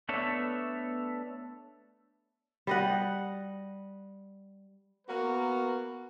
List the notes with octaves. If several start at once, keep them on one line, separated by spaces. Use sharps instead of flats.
A3 B3 D4 A4 C#5 E5
G3 D#5 F#5
A#3 B3 F#4 A#4 B4